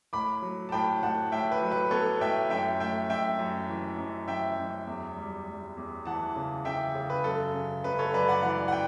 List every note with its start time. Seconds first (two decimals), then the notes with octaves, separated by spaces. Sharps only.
0.13 A2 B5 D6
0.42 F#3
0.69 A5
0.72 A2 G5 B5
1.02 A2 F#5 A5
1.32 A2 E5 G5
1.51 B4
1.61 F#3
1.71 B4
1.91 B3 A4 C#5
2.20 A2 E5 G5
2.50 F#2 E5 G5
2.80 A3 E5 G5
3.10 F#2 E5 G5
3.39 F#2
3.69 E3
3.98 F#2
4.28 F#2 E5 G5
4.58 F#2
4.87 E2
5.17 G3
5.47 G3
5.77 E2
6.06 E3 F#5 A5
6.36 C#3
6.65 C#3 E5 G5
6.95 C#3
7.10 B4
7.24 F#2 A4
7.54 C#3
7.84 F#2 B4
7.99 A4 C#5
8.13 F#2 B4 D5
8.29 D5 F#5
8.43 E3 D5 F#5
8.68 F#5
8.72 G5